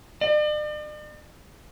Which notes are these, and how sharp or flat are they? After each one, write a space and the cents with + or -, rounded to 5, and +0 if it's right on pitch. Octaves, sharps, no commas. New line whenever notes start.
D5 +45